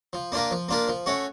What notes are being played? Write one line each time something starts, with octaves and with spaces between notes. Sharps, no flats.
F3
A#3 D4 F4 A#4
F3
A#3 D4 F4 A#4
F3
A3 C#4 F#4